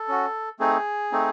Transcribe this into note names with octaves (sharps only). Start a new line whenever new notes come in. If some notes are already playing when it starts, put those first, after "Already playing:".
Already playing: A4
C#4 F#4
A3 C4 D#4 G#4
A3 C4 D#4